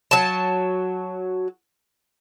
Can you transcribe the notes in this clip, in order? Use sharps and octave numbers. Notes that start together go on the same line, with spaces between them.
F#3 A5